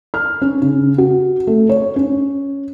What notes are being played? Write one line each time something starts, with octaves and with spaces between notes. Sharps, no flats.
F6
C#4
C#3
F#4
A3
C#5
C#4